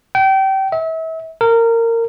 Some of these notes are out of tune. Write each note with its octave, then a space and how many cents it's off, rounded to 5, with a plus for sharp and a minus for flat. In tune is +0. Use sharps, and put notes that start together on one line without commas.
G5 -30
E5 -35
A#4 -20